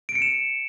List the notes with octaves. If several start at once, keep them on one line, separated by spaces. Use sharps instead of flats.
D7
C#7
E7